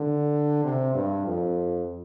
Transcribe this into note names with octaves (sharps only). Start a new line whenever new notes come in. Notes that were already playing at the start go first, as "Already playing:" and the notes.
Already playing: D3
C3
G2
F2